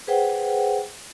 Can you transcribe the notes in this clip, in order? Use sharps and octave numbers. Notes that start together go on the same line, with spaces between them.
G#4 B4 C5 F#5 G5